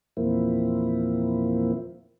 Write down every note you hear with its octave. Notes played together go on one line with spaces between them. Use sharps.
E2 A#2 F3 A#3 C4 E4